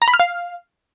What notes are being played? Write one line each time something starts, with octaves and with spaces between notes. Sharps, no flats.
A#5
B5
F6
F5